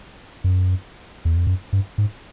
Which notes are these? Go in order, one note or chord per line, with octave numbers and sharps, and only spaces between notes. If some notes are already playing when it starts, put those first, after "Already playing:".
F#2
E2
F2
F#2
G2
G#2